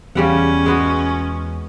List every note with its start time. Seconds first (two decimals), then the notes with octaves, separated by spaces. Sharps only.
0.15 E2 C#3 G3 C#4 F#5
0.66 G#3 B3 F#4